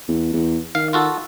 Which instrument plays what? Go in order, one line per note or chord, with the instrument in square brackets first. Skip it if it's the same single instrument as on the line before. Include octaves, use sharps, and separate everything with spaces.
[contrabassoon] E2
E2
[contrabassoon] D#3 [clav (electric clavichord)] F5
[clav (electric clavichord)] F4 F#4 A4